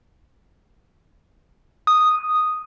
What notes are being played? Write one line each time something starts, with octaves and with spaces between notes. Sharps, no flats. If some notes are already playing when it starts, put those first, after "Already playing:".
D#6